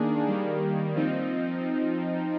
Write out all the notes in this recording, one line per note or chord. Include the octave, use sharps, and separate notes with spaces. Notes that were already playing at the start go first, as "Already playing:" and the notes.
Already playing: D#3 A#3 D4 G#4
D#3 G3 A#3
F3 C4 D#4